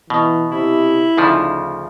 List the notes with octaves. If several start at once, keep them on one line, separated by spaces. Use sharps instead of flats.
B2 E3
C3 E4
D2 C#3 F3 D#4